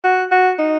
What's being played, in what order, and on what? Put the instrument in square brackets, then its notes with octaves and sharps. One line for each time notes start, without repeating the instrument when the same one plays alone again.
[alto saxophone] F#4
F#4
D#4